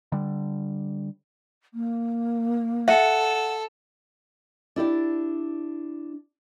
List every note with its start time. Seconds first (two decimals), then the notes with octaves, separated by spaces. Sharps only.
0.12 D3 G3
1.74 A#3
2.88 A4 E5 F#5
4.76 D4 E4 G4 D5